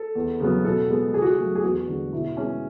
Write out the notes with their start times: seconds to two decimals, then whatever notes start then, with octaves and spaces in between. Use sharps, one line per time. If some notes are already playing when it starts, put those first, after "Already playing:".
Already playing: A4
0.15 E2
0.40 C#3 F#3 B3
0.65 B2 A4
0.89 G#3 B3
1.14 C#3 G#4
1.22 F#4
1.29 G#4
1.39 F#3 A3
1.55 G#4
1.63 E2 F#4
1.88 D3 G#3
2.13 B2 E4
2.37 G#3 B3 C#4